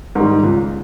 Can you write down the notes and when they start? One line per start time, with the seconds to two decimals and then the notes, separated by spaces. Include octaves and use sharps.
0.15 G#2 D#3 G3
0.43 C#2